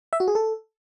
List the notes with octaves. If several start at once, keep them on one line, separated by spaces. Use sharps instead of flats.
E5
F#4
G#4
A4